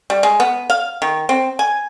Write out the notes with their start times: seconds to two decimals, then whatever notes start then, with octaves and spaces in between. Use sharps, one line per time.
0.10 G3
0.23 G#3
0.40 B3
0.70 F5
1.02 D#3
1.29 C4
1.59 G#5